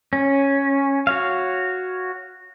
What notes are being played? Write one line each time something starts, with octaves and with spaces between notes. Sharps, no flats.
C#4
F#4 C#5 F5